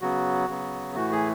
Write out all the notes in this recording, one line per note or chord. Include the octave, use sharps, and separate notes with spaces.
C#3 F#3 B3 F#4
C#3 F#3 B3
A2 E3 A3 F#4
G#4